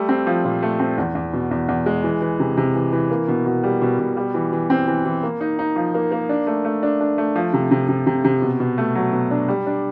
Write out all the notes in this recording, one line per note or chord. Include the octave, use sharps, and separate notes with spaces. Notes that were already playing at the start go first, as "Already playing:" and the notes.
Already playing: G3 A3
C4
F3
A#2
A3
C4
E2
E2
B2
E2
E2
G#3
E3
E3
C3
C3
E3
E3
A#3
B2
B2
G3
B2
B2
G3
E3
E3
C4
E3
E3
A#3
D#4
D#4
F3
A#3
A#3
D4
A3
A3
D4
D4
A3
F3
C3
C3
C3
C3
C3
B2
B2
A3
F#3
B2
D4
G3
D4